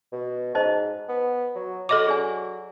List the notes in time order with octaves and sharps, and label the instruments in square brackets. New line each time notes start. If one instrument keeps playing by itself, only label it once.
[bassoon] B2
[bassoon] G#2 [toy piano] C5 D#5 A5
[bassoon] B3
F#3
[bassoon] F#3 [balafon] A4 D#5 D6
[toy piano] G#4 D5 G#5